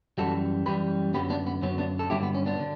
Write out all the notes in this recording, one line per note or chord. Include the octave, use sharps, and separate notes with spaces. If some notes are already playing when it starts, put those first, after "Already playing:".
F#2 E3 G3 F#4 A4
F#2 E3 G3 G4 B4
F#2 D3 F#3 B3 G4 B4
B3 D4
B3
F#2 D3 F#3 B3 C#4
B3 D4
A4
G2 D3 F#3 B3 E4 G4
B3
C#4
B3 D4
D3